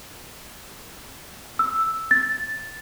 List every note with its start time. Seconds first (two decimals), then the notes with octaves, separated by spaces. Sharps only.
1.59 E6
2.11 A6